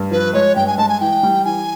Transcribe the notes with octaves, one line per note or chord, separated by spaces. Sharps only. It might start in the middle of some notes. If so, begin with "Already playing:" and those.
Already playing: G2
F3 B4
G#3 C#5
G2 G5
G#5
G#3 A5
G#5
E3 G5
G3
E3 G#5